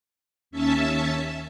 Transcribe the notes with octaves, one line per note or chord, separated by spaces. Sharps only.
D#2 C#4 E5 A5